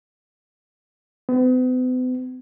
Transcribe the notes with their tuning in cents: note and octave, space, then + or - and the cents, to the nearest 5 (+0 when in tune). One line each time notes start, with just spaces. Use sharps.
B3 +45